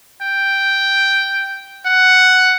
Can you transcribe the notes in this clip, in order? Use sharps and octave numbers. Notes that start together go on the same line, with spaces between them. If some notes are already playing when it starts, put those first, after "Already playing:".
G5
F#5